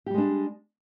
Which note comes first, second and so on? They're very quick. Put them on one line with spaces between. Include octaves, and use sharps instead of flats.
G4 G3 G#3 D4